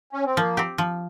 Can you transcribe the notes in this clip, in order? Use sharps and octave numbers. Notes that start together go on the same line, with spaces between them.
C#4
C4
F3 A#3
C4 G4
F3